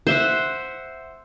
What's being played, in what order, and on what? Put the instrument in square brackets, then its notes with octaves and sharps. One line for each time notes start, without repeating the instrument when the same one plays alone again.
[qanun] C5 E5 F#5